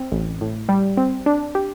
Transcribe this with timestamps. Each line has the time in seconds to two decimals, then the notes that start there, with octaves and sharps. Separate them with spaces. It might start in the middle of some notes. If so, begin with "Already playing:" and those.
Already playing: C4
0.12 A1
0.41 A2
0.69 G3
0.97 C4
1.26 D4
1.55 G4